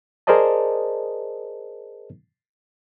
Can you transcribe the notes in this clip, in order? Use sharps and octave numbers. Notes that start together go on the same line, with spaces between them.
G#4 A#4 C5 D5 D#5 A5